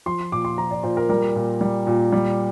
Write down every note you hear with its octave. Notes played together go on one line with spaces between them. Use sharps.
F3 C6
A#2 D6
C6
F3 A#5
D5
A#2 C5
A#4
G3 A#4
A#2
G3
A#2
G3